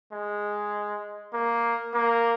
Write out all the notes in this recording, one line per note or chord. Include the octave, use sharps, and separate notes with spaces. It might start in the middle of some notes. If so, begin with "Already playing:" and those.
G#3
A#3
A#3